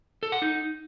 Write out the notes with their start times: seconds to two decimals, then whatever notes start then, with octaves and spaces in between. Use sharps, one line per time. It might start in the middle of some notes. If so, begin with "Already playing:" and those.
0.23 A4
0.32 F#5
0.42 D#4